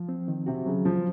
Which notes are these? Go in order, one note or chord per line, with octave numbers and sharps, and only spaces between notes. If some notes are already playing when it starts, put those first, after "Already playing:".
Already playing: F3
C4
D#3
C3 F#4
C#3 F#3
F3 F4